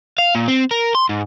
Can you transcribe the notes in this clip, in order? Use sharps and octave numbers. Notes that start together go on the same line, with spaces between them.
F5
A#2
C4
A#4
C6
G#2